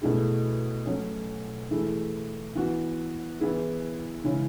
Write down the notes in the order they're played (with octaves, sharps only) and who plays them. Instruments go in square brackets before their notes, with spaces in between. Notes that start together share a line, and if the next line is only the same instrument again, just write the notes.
[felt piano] B2 A3 E4 G#4
F#3 A3 C#4
E3 A3 E4 G#4
E3 B3 F#4
E3 B3 E4 G#4
C#3 E3 G#3 C#4 E4